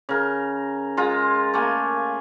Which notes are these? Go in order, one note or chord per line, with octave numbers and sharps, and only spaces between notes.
C#3 A#4
G#3 F4 A#5
A3 A#3 G#5